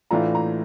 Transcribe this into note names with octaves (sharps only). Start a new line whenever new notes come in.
A2 E3 A3 D4 F4 A#5
A#5